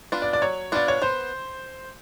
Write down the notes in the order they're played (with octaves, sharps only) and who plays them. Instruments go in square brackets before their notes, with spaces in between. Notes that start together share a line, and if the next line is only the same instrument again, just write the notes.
[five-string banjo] B3 D4 F4
[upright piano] D5
D5
[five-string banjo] F#3 [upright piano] C#5
[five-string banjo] B3 D4 F4 [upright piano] D5
[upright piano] C#5
[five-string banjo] B3 [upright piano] C5